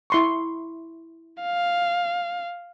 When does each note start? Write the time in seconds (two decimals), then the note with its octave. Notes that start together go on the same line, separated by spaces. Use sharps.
0.10 E4 C6 C#6
1.42 F5